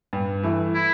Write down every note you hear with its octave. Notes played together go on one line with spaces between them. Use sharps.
G2
E3 A3 E4
E4